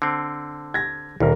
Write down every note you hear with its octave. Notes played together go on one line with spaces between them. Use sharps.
D3 C4
G#6 A#6
D#1 D2 A#4